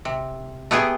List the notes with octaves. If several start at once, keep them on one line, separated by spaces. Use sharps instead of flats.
C3
A3 B3 G4 G#4